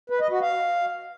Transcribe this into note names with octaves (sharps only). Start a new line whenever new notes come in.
B4
D#5
F#4
F5